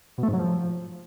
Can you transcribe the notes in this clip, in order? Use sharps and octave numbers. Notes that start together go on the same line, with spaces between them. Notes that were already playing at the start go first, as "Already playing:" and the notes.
B2
A3
G#2
F#3
F3